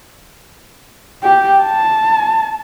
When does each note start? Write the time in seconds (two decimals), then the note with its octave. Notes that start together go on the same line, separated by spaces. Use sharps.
1.24 G4
1.63 A5